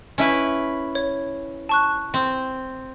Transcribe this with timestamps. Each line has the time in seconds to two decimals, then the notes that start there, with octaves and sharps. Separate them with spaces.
0.18 C#4 E4 B4
0.95 C#5
1.69 A5 C#6 F#6
2.14 C4